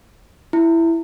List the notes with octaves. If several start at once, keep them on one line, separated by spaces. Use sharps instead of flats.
E4